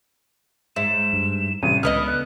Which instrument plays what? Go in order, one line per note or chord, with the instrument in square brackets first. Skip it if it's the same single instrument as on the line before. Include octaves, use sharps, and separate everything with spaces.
[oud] G#2 [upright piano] E5 [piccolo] E7
[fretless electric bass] G2
[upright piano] A1 [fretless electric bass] C3 G3 [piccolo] D#7
[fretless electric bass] C#2 [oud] D3 B3 D#5 [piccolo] D#6 [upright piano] F6
[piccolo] F#6